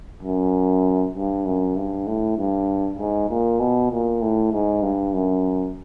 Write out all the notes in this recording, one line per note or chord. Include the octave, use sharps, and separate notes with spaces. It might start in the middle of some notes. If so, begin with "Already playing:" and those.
F#2
G2
F#2
G2
A2
G2
G#2
A#2
B2
A#2
A2
G#2
G2
F#2